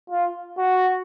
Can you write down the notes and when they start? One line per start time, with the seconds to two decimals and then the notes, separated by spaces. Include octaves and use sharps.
0.10 F4
0.58 F#4